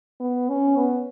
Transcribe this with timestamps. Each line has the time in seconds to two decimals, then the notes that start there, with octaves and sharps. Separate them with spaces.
0.20 B3
0.49 C#4
0.76 B3